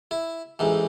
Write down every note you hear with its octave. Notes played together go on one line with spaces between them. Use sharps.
E4
A1 G#2 E3